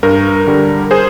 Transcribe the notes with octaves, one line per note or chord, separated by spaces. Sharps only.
G2 A#4
D3 G3
G#4 C5